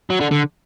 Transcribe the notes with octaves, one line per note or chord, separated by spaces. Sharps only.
F#3
D3
D3